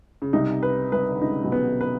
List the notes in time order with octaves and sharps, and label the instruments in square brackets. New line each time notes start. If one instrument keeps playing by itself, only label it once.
[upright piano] C#3
[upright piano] C2 C3 [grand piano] D#4
[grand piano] B4
[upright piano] C2 C3 [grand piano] B4
[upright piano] D3
[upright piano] C#2 C#3 [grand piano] D#4
[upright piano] B1 B2
[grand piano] B3
B4